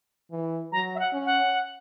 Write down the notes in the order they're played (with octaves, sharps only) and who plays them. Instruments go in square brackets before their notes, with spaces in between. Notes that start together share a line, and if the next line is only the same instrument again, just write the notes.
[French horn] E3
[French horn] F#3 [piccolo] A#5
[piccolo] E5
F#5
[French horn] C#4
[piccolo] F#5